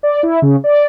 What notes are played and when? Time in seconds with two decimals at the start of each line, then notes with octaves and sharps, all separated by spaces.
0.03 D5
0.23 E4
0.42 C#3
0.64 D5